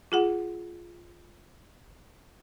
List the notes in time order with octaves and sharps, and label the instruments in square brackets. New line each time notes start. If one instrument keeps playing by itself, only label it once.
[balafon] F4 G#4 F#5